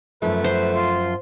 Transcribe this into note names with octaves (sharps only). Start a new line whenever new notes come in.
F#2 F3 A3 B4
C5
F4 C6